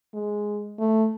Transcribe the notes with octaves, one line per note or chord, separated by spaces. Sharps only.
G#3
A3